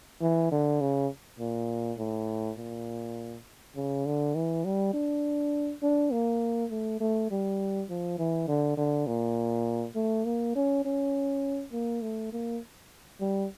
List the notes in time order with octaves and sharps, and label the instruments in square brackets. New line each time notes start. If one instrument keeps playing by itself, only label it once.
[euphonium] E3
D3
C#3
A#2
A2
A#2
C#3
D3
E3
G3
D4
D4
A#3
A3
A3
G3
F3
E3
D3
D3
A#2
A3
A#3
C#4
C#4
A#3
A3
A#3
G3